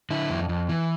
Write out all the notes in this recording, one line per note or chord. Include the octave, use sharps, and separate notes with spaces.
D3 E4
F2
F2
E3